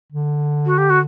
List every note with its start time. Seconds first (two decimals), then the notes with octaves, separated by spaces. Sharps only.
0.12 D3
0.66 F#4
0.78 G4
0.90 F#4